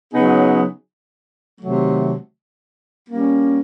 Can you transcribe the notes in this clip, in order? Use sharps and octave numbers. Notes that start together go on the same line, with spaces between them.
C#3 F#3 B3 D#4 G#4
C3 D#3 F#3 A3
G3 A#3 C#4